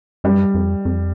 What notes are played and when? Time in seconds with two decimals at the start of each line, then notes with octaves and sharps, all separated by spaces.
0.24 F#2 G3
0.54 F2
0.85 F2